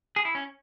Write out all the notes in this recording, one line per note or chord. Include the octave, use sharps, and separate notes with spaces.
G#4
E4
C#4